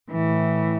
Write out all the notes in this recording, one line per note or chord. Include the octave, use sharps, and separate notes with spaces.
E3
A2